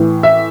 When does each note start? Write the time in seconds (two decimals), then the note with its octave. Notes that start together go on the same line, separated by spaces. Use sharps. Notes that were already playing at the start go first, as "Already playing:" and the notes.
Already playing: A2 E3
0.23 E5